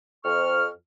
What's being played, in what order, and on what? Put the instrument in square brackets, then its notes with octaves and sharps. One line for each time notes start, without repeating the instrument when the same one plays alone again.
[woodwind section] F2 C#6 F6